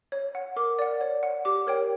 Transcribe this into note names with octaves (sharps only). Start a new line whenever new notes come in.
C#5
F#5
A#4 D6
D5 F#5
C#5
F#5
G4 D6
A#4 C#5 G5